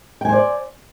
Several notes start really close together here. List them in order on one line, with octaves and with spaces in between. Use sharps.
G5 G#5 C5 D5